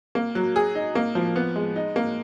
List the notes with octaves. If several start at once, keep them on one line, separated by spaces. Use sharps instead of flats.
A#3
F#3
G#4
D#4
A#3
F3
B3
G#3
D#4
A#3